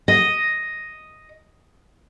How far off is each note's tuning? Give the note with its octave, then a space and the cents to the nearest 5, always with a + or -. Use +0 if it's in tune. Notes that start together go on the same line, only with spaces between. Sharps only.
D#5 +0